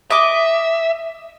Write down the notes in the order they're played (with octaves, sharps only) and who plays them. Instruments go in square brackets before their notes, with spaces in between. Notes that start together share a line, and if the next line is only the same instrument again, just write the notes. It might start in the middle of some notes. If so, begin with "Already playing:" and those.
[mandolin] D#5 D6 [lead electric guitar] E5